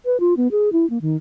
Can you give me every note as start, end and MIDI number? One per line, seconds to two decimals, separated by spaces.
0.05 0.20 71
0.20 0.34 65
0.37 0.48 59
0.51 0.69 68
0.72 0.88 64
0.90 1.01 58
1.01 1.16 51